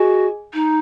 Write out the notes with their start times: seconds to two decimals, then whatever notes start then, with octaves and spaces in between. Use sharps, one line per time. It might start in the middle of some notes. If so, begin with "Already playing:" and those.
Already playing: F#4 G#4 D#5 G#5
0.54 D#4